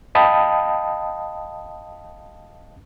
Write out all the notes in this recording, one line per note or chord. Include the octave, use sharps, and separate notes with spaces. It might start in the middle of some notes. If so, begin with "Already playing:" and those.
D#5 F5 G5 A5 B5 D#6